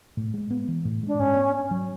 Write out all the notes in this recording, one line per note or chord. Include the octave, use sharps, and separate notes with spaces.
A2
G#3
B3
E3
A2
G#3 D4
G#2 C#4
B3
D4
F#3